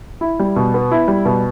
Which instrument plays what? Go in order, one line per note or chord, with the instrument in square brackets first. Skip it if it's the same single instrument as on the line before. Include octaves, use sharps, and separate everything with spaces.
[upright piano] E4
G3
B2
B3
E4
G3
B2